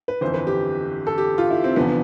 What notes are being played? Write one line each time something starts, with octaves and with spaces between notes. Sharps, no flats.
B4
G1 F2 E3 C5
B4
G4
A4
G4
F4
E4
C4
F1 E2 D3 F3 B3